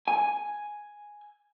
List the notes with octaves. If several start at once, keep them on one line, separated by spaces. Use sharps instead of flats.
G#5